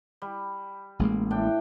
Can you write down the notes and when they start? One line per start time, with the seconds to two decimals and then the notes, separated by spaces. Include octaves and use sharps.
0.22 G3
0.99 A1 G#3 A#3
1.31 A2 D4 G5